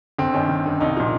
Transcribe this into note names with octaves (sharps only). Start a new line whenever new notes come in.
G1 C4
G2 D#3 C#4
G1
G2 D#3
C2 D#4
A#2 F3